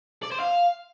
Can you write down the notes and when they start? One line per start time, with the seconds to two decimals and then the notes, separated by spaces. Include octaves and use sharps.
0.23 D5
0.31 C5
0.40 F5